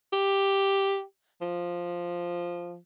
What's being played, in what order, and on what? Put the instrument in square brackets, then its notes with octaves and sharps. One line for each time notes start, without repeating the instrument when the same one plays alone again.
[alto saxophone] G4
F3